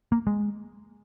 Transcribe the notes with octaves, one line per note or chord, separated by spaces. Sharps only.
A#3
G#3